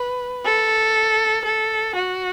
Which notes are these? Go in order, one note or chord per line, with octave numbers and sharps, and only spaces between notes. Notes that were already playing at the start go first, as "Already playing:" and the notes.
Already playing: B4
A4
A4
F#4